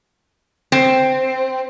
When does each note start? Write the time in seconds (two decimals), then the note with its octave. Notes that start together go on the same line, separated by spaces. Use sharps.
0.72 C4